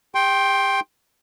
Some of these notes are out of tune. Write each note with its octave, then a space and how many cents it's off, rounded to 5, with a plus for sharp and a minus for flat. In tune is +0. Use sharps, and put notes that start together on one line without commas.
G4 +45 G5 +0 C6 +20